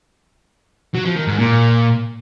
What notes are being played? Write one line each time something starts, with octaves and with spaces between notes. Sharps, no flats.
F#3
F3
D#3
G#2
A#2